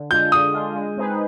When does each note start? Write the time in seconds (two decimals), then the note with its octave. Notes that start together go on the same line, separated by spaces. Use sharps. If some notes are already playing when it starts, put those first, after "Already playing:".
Already playing: D3
0.11 G#3 D4 F4 G6
0.32 D3 D#6
0.54 G#3 D4 F4
0.75 G#3
0.97 C4 D#4 G#4 B4